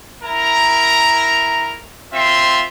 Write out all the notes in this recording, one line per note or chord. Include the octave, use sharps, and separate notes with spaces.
E4 A#4 A#5
C4 F4 E5 C6